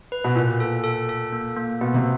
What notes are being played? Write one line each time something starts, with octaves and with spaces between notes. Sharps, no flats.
B4
B2
A#2 A#3
A4
A4
A4
A#3
A#3
B2 B3
C3